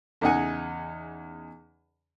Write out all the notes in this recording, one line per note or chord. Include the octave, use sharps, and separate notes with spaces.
E2 C#3 D#4 D#5 F#5 G#5